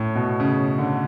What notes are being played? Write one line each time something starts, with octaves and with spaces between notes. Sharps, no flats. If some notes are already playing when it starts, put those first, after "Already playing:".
Already playing: A2
B2
C#3
D3